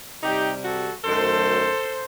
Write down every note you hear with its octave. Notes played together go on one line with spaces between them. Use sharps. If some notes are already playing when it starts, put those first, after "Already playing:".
C3 G3 D#4 G4
F#4 A4
F#2 D#3 F#3 A3 A4 C5